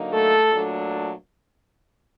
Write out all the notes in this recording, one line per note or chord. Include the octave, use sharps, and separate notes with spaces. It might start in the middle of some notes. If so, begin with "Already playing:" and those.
Already playing: D3 F#3 A#3 D#4
A3 A4
A#2 F#3 A3 D4